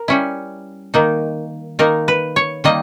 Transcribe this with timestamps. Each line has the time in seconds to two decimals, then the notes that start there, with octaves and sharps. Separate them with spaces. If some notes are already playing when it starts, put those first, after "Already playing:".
Already playing: A#4
0.08 G3 C#4 E4
0.94 D#3 A#3 D#4
1.79 D#3 A#3 D#4 A#4
2.08 B4
2.36 C#5
2.64 D#3 G3 A#3 D#5